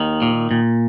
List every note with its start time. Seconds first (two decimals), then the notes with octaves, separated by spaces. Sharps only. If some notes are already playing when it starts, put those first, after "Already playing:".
Already playing: D#2 D#3
0.22 A#2
0.51 A#2